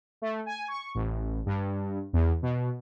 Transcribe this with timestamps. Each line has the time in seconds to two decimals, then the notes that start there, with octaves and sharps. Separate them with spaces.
0.22 A3
0.46 G#5
0.68 C#6
0.95 A1
1.46 G2
2.13 E2
2.42 B2